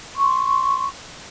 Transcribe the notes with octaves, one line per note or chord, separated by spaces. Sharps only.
C6 C#6